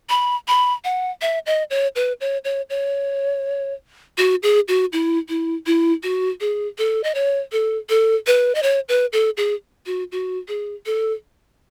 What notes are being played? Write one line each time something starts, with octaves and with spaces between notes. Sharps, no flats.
B5
B5
F#5
E5
D#5
C#5
B4
C#5
C#5
C#5
F#4
G#4
F#4
E4
E4
E4
F#4
G#4
A4
D#5
C#5
A4
A4
B4
D#5
C#5
B4
A4
G#4
F#4
F#4
G#4
A4